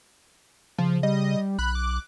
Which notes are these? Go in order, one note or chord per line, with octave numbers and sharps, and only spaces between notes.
C#3 F3
G3 D#5
B1 B5 F#6
D6